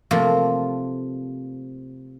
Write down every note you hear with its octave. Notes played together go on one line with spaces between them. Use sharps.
C3 F3 A3 A#3